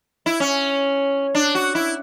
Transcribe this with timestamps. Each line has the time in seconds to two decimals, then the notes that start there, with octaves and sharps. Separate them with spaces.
0.26 E4
0.40 C#4
1.35 D4
1.55 F#4
1.75 E4